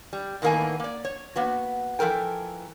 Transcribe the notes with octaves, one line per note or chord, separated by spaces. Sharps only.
G3
A2 D#3 E3 A#3 B3 G#5
A#3 D5
C#5
A#3 B3 F#4
E3 F3 A4 A#4 G5